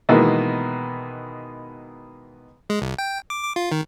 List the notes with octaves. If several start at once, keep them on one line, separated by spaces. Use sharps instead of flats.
B2 D#3 E3 G#3 A#3 B3
G#3
C2
G5
D6
D6
F4
D#3